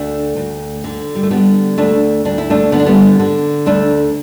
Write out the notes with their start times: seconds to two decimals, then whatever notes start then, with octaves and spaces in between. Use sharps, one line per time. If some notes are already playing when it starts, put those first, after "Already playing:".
Already playing: D2 A3 D4
0.37 D2
0.84 D3
1.15 G3
1.23 A3
1.31 D3 G3 B3
1.78 D2 A3 D4
2.25 D2 D4
2.38 E4
2.50 A3 D4
2.72 D3 B3
2.80 D4
2.86 G3 B3
3.20 D3
3.66 D2 A3 D4